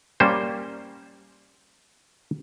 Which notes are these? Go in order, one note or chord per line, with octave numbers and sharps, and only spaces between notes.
G3 A#3 C#4 C5